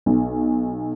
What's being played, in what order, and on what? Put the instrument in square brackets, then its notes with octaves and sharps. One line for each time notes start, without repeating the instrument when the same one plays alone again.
[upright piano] B1